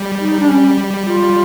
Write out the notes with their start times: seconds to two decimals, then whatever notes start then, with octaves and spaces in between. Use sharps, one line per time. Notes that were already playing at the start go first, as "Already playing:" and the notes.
Already playing: G3
0.20 D#4
0.40 D4
0.49 C#4
1.05 F4